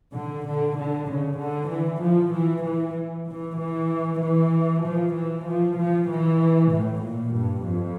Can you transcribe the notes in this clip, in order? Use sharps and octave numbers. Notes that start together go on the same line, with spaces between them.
D3
D3
D3
C#3
D3
E3
F3
E3
E3
E3
E3
E3
F3
E3
F3
F3
E3
A2
A#2
G2
F2